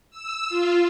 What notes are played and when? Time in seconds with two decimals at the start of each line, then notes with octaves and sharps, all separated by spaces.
0.11 E6
0.49 F4